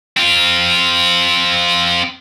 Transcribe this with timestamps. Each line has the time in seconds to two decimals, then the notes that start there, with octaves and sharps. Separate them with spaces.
0.17 C4 F4